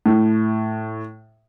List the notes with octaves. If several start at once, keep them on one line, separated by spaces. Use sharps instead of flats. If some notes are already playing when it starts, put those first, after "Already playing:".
A2